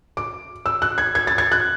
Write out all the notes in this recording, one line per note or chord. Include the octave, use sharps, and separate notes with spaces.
D6
E6
F#6
G#6
G#6
A6
G#6
F#6